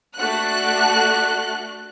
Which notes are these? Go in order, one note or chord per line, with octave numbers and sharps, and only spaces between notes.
A3 D4 F#4 F#6